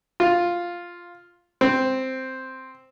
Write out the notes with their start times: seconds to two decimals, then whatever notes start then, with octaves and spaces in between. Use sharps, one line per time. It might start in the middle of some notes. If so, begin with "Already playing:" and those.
0.20 F4
1.61 C4